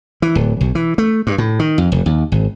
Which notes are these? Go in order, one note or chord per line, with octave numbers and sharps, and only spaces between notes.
E3
D1
B1
E3
A3
G2
A2
D#3
F2
F1
D#2
G#1